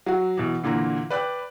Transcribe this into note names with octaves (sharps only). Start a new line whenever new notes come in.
F#3 F#4
B2 E3
A#2 D3 E3 A#3 A#5
B4 D5 G5 F#6